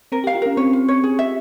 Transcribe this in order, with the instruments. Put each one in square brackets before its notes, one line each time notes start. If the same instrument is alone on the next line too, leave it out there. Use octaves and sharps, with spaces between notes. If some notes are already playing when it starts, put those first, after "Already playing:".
[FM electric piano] C4 [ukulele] A#4
[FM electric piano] G4
[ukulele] F5
[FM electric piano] F4
[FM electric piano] C#4 [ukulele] A#4
[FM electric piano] C4 [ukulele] C#5
[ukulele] F4
C#5
G#4
E5